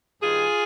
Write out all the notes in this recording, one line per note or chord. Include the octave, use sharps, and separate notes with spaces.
G2 D#3 F4 G#4